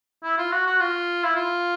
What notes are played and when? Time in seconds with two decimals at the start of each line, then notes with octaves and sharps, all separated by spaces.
0.24 E4
0.38 F4
0.52 F#4
0.66 F#4
0.80 F4
1.24 E4
1.35 F4